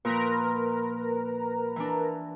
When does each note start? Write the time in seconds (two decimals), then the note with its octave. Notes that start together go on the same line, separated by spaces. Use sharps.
0.05 A#2 F3 A#4 B4 A#5
1.76 E3 D4